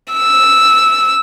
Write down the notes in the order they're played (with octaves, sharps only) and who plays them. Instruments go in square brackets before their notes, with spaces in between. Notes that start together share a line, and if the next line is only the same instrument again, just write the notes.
[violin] E6